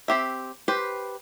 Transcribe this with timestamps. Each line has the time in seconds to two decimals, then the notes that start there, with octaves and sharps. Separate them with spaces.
0.08 C4 G4 E5
0.68 G4 B4 C5